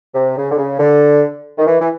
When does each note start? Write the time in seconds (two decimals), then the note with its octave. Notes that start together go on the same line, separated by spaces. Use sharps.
0.14 C3
0.37 C#3
0.50 D3
0.58 C#3
0.79 D3
1.58 D#3
1.66 E3
1.80 E3